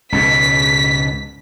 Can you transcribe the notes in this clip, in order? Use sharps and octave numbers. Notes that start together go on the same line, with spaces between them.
C#2 G#2 B2 B6